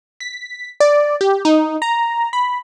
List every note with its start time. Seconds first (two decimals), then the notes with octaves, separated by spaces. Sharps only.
0.20 B6
0.80 D5
1.21 G4
1.45 D#4
1.82 A#5
2.33 B5